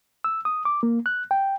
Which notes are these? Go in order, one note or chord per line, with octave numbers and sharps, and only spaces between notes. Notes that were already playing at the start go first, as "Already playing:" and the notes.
E6
D#6
D6
A#3
F#6
G5